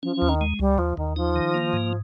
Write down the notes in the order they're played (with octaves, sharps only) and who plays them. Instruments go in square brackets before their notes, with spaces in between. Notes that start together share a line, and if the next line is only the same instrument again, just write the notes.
[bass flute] F3 [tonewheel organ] C#4
[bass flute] F3
[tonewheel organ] D#2
[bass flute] D#3
[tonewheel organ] G#3
[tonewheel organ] C#2 [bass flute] G3
[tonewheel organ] D#2 [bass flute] F3
[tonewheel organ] D#2 [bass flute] D#3
[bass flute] F3 [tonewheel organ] D#4
[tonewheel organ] D#3
A#3
G#2